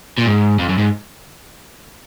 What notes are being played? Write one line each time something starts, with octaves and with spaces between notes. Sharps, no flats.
A#2
G#2
F2
F#2
G#2